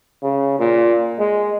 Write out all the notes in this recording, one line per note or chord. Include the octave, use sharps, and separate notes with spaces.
C#3
A#2
G#3